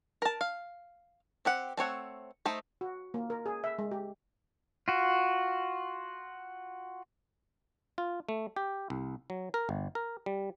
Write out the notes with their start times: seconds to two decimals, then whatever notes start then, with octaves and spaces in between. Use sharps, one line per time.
0.22 A#4 A5
0.41 F5
1.45 C4 G4 F#5
1.77 A3 C4 C#5 F#5
2.46 A3 D#4 C5
2.81 F#4
3.14 A#3
3.30 A#4
3.46 G#4
3.64 E5
3.79 G#3
3.91 G4
4.88 F4 F#4
7.98 F4
8.29 A3
8.56 G4
8.90 C2
9.30 F#3
9.54 A#4
9.69 G1
9.95 A#4
10.26 G3